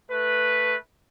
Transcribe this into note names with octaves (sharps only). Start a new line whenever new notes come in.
A3 B4